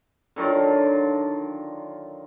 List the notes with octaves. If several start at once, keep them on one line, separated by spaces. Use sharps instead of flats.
D3 D#3 F#3 F4